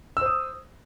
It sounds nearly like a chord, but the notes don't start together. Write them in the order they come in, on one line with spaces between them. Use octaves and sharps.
E6 C5 D#6